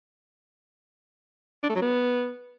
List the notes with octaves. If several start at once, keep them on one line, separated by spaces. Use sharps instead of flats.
D4
A3
F#3
B3